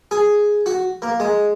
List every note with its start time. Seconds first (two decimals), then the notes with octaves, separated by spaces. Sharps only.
0.11 G#4
0.66 F#4
1.02 A#3
1.20 G#3